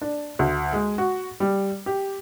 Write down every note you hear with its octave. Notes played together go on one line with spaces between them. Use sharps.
D4
D2
G#3
F#4
G3
G4